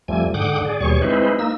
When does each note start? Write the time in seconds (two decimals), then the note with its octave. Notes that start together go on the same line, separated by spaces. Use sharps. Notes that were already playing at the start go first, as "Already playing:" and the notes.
0.08 F2 F3 G3 A3 G#5
0.34 G#2 D3 F#5 G5 D6 D#6
0.65 G#4 D5
0.80 D#2 B2 G3 G#4 C#5 C#6
1.02 G#3 C4 D#4 E4 B4 C5
1.39 A#3 D#4 E6